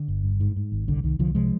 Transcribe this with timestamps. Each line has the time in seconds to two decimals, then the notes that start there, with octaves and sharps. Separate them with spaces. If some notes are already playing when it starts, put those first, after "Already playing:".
Already playing: D3
0.08 G1
0.24 G2
0.40 G#2
0.56 G#2
0.72 G#1
0.88 C2 D3
1.04 C2 D#3
1.19 C2 D3 F3
1.35 C3 F3 G#3